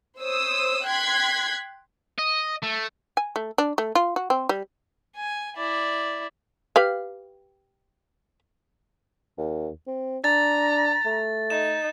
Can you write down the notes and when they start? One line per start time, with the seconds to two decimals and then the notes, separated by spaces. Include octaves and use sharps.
0.20 C5 C#5 D#6 E6
0.85 G5 C6 F#6 G#6 B6
2.19 D#5
2.63 A3
3.17 G#5
3.36 A3
3.58 D4
3.78 A3
3.95 F4
4.16 F#4
4.30 C4
4.49 G3
5.16 G#5
5.56 E4 D5
6.76 G4 B4 F5
9.38 D#2
9.87 C4
10.24 D4 A#5 A6
11.05 A3
11.50 D#4 E7